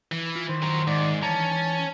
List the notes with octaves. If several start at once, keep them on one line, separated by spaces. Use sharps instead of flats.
E3
F4
D#3 C5
F#3 A#4
G#2 D5
E3 C#4 A5 A#5